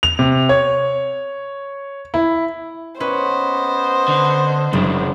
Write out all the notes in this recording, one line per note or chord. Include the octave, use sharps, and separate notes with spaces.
F7
C3
C#5
E4
B3 C#4 B4 C5 D#5
D3
F#1 F#2 D4